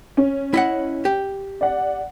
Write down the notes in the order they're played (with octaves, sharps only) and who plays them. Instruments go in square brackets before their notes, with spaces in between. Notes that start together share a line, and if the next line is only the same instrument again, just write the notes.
[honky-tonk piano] C#4
[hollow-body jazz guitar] E4 D#5 F#5
G4
[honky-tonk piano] D5 F#5